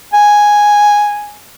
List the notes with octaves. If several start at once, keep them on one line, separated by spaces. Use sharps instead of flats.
G#5